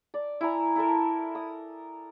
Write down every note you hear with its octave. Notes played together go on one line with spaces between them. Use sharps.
D5
E4 E5 G#5 A#5
E4 A4 A#4
D#6